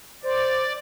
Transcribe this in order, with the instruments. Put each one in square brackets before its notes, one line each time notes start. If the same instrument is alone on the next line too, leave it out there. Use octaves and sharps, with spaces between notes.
[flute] C5 [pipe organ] D5